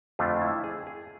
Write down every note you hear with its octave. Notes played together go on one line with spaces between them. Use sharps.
F2 D3 A3 F4
E4
G#4
G#4